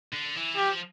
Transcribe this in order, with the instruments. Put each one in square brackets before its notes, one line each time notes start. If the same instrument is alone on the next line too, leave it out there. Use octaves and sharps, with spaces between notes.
[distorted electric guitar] D3
E3
[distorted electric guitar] F3 [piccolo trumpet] G4